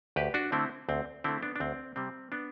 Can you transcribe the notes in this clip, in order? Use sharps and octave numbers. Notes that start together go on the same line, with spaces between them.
D2 G4 B4
D4 F#4
D3 A3 C4 E4
D2 C4
D3 A3 C4 E4
B3 D4
D4
D2 C4
C3 G3 C4
B3 D4